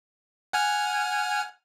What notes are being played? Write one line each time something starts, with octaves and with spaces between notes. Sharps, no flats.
F#5 G#5 F6